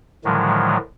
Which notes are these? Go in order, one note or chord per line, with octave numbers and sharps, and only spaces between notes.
A2 D3 D#3 F3 F#3 G#3